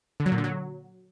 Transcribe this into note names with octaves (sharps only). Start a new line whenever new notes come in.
D3
F#3
A#2
D3
F#3